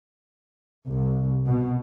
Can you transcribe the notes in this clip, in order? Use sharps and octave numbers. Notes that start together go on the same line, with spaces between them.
C2
B2